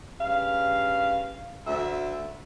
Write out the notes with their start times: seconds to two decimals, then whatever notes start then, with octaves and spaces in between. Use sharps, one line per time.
0.19 G2 C#3 F5
1.66 D2 E5